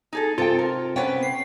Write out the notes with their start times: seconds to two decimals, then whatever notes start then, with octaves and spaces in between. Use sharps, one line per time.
0.13 D#4 G#4 A4
0.38 C3 C4 F4 A4 F5 G5
0.59 A#4
0.96 C3 B3 C#4 F#5 G5
1.23 C7